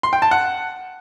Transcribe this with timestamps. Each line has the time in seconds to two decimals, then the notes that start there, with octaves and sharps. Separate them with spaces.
0.03 C6
0.13 G5
0.22 A5
0.31 F#5